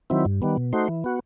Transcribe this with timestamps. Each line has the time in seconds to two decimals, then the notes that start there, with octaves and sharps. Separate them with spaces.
0.10 D#3 F#3 C4 E4
0.25 G2
0.42 D#3 G3 B3
0.57 B2
0.73 A3 D#4 F#4 C5
0.88 E3
1.04 B3 F#4